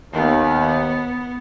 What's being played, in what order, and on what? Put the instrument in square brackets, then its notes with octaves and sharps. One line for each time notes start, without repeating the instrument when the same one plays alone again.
[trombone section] D#2 [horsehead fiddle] B3